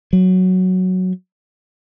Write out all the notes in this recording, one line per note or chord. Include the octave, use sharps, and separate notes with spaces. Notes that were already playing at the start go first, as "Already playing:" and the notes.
F#3